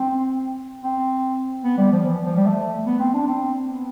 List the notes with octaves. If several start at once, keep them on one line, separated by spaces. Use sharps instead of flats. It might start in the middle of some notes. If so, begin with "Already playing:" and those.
Already playing: C4
C4
B3
G3
F3
E3
F3
G3
A3
B3
C4
D4
C4
B3